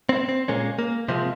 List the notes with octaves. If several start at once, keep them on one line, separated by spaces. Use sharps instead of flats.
C4
C4
A#2 G#3 A#3 C#4
A#3
C3 F3 G#3 C4